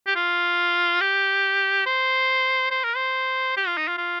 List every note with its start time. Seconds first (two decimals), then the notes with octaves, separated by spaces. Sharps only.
0.07 G4
0.16 F4
1.01 G4
1.86 C5
2.71 C5
2.84 A#4
2.96 C5
3.57 G4
3.67 F4
3.78 D#4
3.88 F4
3.98 F4